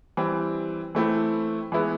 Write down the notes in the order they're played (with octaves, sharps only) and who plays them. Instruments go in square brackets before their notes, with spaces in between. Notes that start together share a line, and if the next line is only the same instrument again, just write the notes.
[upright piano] E3 G3 C4
E3 A3 C4 E4
E3 G#3 B3 E4